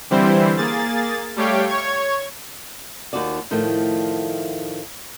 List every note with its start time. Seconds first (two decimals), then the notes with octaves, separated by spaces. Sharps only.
0.10 D3 E3 G3 C4 E4 C5
0.57 A#3 G#4 A6
1.36 G3 A3 G4 C#5 F5 G5
1.68 C#5 C#6 G#6
3.13 D#2 D#4 F4 F#4 D5
3.51 A2 D#3 F3 A3